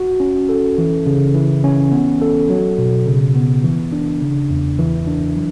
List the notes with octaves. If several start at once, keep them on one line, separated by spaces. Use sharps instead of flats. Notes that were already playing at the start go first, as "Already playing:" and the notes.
Already playing: F#4
C#4
A4
E3
C#3
E3
C#4
B3
A4
F#3
B2
C#3
B3
E3
D4
C#3
E2
E3
D4
F#3